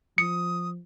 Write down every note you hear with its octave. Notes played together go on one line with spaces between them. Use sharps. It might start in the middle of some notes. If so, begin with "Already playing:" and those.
F3 D#6 C#7